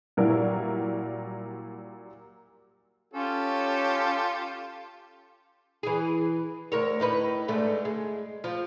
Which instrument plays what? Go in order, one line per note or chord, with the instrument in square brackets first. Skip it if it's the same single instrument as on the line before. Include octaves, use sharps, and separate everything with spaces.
[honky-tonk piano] A#2 F#3 G3 E4 F#4 A#4
[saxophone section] C#4 [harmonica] F4 G4 A4
[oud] E3 G#4
D2 A#4 C#5
A2 D#4 B4
G#2 D3 A3
G#3
F3